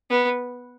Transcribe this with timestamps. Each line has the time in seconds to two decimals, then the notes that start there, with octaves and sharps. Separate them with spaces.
0.10 B3